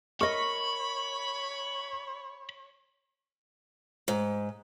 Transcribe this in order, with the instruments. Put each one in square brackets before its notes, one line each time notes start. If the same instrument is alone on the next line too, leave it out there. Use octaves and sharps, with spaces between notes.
[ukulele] A#4 D#5 [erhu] C#5 [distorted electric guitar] B5 [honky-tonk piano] C#6
[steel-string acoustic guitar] G#2